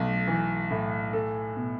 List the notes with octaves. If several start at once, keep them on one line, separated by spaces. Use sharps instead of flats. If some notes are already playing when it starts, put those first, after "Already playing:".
Already playing: B1 A3
E3
A2
A4
B2